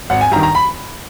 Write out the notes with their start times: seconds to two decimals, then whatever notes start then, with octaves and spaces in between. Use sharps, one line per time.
0.10 G#1 F#5
0.21 G#5
0.32 G2 A#5
0.36 D#3
0.43 A#5
0.55 B5